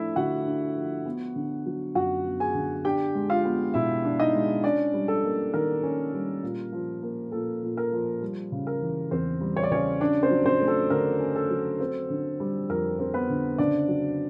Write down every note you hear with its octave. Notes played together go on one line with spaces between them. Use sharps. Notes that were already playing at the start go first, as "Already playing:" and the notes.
Already playing: F3 A3 D4 E4 E5
D3 F#4 F#5
D4
F3
B3
D3
F#3
F#2 F#4 F#5
B3
G#4 G#5
D3
D4 G4 G5
G#3
F4 F5
B3
B2 E4 E5
D4
D#4 D#5
G#3
C#4 D4 D5
G3
A4
A#3
D#3 A#4
C#4
G3
A#2
F3
A#3
A#2 A4
A#2
A#4
F3
G3
C#3
A#4
E3
E2 C4 C5
G3
C#5
D5
C#3 C#4 C#5
C#4 D4 D5
C4 C5
F#3
C4 C5
A3
A4
D3 A#4
C#4
A4
F#3
C4
D3
G3
F2 A#4
C4
B3 B4
D3
C#3 D4 D5
F#3